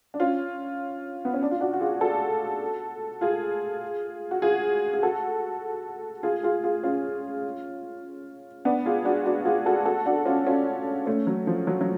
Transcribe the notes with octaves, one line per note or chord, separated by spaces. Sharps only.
D4
C#4 F4
B3
C#4
D4
F4
D4 F#4
F#4
F4 G#4
F#4 A4
F4 G#4
F#4
F4 G#4
G#4
F#4 A4
F4 G#4
F4 G#4
F4 G#4
C#4 F4
B3 D4
F4 G#4
D4 F#4
D4 F#4
F4 G#4
F#4 A4
F#4 A4
D4 F#4
C#4 F4
C#4 F4
A3 C#4
F#3
F3
F#3
F#3